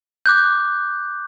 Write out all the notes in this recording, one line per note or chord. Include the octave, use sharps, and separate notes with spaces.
D6 F#6 G6